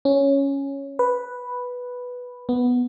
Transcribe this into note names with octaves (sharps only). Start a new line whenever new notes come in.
C#4
B4
B3